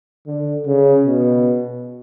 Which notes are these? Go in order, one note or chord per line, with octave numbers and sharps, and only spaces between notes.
D3
C#3
B2